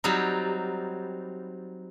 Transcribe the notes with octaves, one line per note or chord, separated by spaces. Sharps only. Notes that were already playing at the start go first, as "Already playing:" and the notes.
F#3 G3 C4 D#4